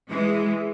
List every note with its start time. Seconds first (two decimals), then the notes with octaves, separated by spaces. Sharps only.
0.09 E3 G#3